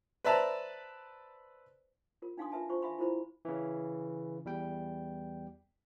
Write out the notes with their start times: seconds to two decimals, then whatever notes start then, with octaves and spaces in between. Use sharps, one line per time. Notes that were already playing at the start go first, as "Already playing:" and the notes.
0.24 B4 C5 D5 E5 A5 A#5
2.22 F4 A#4
2.37 D4 D#4 F5 G#5 C6 D#6
2.52 F4 A#4 B4 E5 G#5 A5
2.69 F4 C5 C#6
2.82 E5 F5 G#5 B5 C6
2.98 E4 F4 A#4 C5 B5
3.45 C#3 E3
4.45 E2 G3 G5